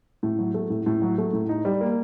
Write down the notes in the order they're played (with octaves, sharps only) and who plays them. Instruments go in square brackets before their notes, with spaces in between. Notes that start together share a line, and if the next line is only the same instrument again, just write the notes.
[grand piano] A2
F#3
A3
A2
A2
F#3
A3
A2
D#4
G3
A#3